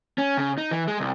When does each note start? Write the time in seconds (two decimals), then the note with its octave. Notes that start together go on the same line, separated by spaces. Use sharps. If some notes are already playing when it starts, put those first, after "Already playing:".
0.18 C#4
0.38 C#3
0.58 D#4
0.71 E3
0.88 G#3
1.00 C2